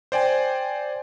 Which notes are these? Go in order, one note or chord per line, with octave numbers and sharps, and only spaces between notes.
C5 D5 G5 G#5